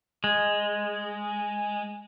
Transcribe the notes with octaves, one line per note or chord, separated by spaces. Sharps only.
G#3